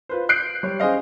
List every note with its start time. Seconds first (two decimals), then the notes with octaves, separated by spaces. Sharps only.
0.09 F4 B4 C5
0.29 F#6 G6 C7 D7
0.63 G3 C#5
0.80 C#4 G#4 C5 D#5 F5